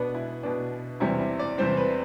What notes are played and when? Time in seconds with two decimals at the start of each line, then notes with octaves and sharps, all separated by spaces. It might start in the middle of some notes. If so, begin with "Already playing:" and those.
Already playing: B2 B3 D4 B4
0.14 E4
0.43 B2 B3 D4
1.00 E2 C3 G3 C4 E4
1.19 E4
1.39 D5
1.58 E2 C3 G3 C4 C5
1.77 B4